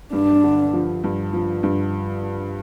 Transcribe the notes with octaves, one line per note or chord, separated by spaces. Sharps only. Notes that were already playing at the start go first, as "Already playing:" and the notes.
G2 D4
D3
F3
G2
F3
G2